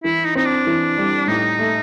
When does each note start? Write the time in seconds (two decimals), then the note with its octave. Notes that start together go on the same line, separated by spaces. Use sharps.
0.04 E3 E4
0.25 D#4
0.35 C4 D#4
0.45 D4
0.66 E3
0.98 G3
1.28 A2 D#4
1.59 A3